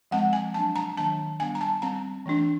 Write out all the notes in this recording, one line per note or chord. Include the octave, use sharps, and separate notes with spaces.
F3 G#3 C4 F#5
G#5
F#3 A#3 D4 A5
A#5
D#3 F#3 A#3 D4 A5
G3 B3 D4 G#5
A#5
A5
G3 C4 A#5
E3 A3 D4